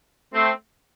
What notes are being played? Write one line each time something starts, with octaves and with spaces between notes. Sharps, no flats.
A3 C4